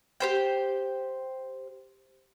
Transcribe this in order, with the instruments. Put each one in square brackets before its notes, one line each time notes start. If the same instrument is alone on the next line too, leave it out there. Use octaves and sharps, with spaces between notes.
[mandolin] G4 C5 G5